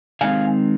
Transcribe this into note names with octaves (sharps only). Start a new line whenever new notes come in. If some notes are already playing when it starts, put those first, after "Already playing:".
D#3 G#3 C4 F5 G#5